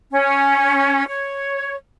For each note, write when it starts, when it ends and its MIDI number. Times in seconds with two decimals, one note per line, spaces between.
0.12 1.06 61
1.07 1.75 73